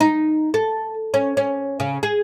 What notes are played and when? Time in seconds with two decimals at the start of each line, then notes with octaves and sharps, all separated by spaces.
0.01 D#4
0.54 A4
1.14 C#4
1.37 C#4
1.80 C#3
2.03 G#4